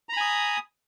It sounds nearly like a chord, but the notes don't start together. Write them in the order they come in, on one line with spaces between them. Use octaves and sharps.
A#5 B5 G#5 D#6